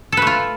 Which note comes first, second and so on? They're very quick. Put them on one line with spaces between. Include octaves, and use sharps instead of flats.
A4 B4 A3 F4